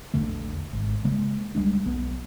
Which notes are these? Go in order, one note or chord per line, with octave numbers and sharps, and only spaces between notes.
A#1 E2 D3 A3
G#1
C#3 G#3 A#3
C#2 G3 G#3 D4
B1 B3